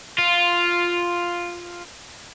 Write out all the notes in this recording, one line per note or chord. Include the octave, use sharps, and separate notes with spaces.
F4